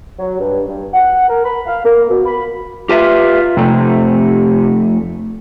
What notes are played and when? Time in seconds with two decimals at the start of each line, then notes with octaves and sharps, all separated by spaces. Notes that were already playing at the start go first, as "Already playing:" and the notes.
0.19 F#3
0.40 G2
0.67 G2
0.94 F#5
1.28 A#4
1.44 B5
1.67 F5
1.85 A#3
2.10 B2
2.26 B5
2.89 F4 G4 B4 E5
3.57 F2 C3 A3